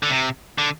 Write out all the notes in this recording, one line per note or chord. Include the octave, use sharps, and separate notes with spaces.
D3
C3
D3